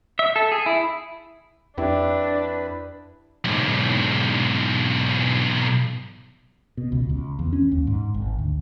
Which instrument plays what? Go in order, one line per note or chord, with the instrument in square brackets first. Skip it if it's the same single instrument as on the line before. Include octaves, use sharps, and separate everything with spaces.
[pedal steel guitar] E5
A4
G#4
E4
[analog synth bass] F2 [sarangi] D4 [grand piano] E4 G4 [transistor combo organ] B4
[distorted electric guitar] B1 G#2
[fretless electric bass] B2
C#2
C#2
E2
C#4
D#2
G#2
G#1
D2